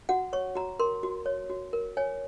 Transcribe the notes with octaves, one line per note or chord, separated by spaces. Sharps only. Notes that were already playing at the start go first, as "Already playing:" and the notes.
F#4 F#5
C#5 C#6
F#4 A#5
A#4 C6
F#4
C#5
F#4
A#4
C#5 G#5